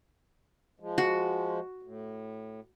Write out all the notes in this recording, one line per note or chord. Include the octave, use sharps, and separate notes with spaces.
F3 G#3
F#4
A2